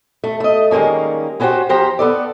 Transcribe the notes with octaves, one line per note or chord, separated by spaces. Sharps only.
A3
A3 D#5
D#3 G3 G#3 A#3 C#4
B3 C#4 F#4 G4 C5
E2 F3 G4 C5 A#5
B3 A4 D5